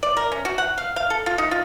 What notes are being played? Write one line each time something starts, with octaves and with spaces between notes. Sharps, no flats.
D5
A#4
C#4
F#4
F#5
F5
F5
A4
F4
D#4
F4